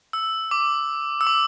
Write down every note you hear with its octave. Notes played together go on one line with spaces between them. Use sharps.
E6
D6
E6
D6